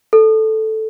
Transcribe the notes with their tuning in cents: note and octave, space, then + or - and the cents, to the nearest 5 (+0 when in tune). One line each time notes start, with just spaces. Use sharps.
A4 -5